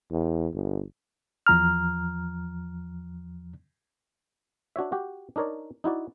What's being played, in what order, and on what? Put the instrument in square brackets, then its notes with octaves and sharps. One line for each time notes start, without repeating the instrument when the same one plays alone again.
[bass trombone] E2
G1
[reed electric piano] E2 F3 A#5 F6
[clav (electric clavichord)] D4 F#4 C#5 E5
F#4 G4
D4 D#4 A#4 C#5 D5
D#4 E4 F#4 D5